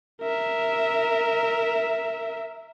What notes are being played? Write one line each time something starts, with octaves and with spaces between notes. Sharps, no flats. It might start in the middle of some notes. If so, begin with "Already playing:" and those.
A#4 E5